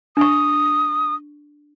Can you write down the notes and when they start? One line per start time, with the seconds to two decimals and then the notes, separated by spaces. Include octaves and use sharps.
0.17 D4 C#6 D#6